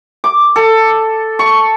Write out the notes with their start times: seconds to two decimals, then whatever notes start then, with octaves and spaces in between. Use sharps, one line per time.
0.24 D6
0.56 A4
1.39 C#6